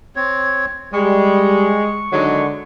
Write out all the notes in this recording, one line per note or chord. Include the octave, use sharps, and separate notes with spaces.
C4 C#5
G3 G#3 C#6
D3 D#3 F#3 G#3